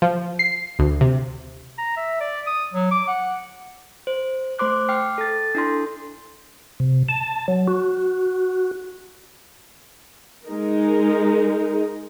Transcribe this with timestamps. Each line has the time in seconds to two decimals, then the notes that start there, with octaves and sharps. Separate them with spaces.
0.02 F3
0.39 C7
0.79 D2
1.01 C3
1.78 A#5
1.96 E5
2.20 D5
2.46 D#6
2.73 F#3
2.91 D6
3.08 F#5
4.07 C5
4.59 A3 C5 C6 D6 F#6
4.89 G5 D6 F6 C7
5.18 A4 A6
5.55 D4 E4 A4 C6
6.80 C3
7.09 A5
7.48 F#3
7.68 F#4
10.47 G#3 D#4 A#4